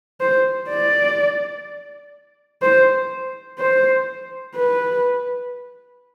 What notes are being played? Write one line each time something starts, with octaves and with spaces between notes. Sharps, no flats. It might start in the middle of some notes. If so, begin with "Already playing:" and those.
C5
D5
C5
C5
B4